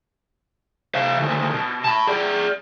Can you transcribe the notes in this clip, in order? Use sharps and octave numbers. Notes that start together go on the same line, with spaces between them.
C3 F5
D2 D#3
B2
A5 B5
G#4 D5